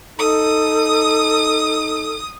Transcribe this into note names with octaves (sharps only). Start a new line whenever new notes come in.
D#4 A4 D#6